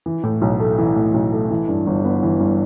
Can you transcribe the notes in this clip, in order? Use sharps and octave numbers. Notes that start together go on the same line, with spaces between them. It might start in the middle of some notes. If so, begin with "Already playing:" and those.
E3
A2
B1
A3
E3
A2
B1
A3
E3
G2
G1
B3
E3
G2